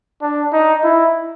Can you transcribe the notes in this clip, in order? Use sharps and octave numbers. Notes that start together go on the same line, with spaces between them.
D4
D#4
E4